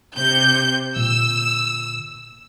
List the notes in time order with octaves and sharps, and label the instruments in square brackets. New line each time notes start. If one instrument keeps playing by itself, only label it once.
[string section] C3 G6
[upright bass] A#2 D3 [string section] E6